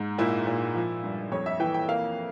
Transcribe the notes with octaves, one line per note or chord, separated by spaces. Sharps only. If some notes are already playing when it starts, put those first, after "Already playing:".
Already playing: G#2
A#2 E4
A#2
F3
G2
F2 C#5
E5
E3 G5
G5
A#3 F5